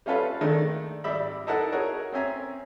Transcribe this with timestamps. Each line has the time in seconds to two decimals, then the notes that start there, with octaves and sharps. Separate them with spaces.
0.06 G3 C#4 F4 A4 B4 F5
0.41 D#3 G#3 A3 D4
1.04 G#1 G3 D5 E5 B5
1.47 D#4 E4 A4 A#4 F#5 A5
1.72 F#4 G#4 A#4 C#5
2.12 C4 C#4 E5 G#5 A#5